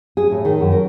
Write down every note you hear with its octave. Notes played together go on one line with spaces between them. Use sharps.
G#4
A2
D#3
F#2
A#4